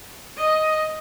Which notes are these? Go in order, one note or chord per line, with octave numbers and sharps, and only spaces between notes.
D#5